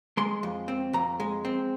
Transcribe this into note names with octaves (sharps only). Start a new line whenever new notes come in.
G#3 C6
F2
C4
F2 A#5
G#3
C4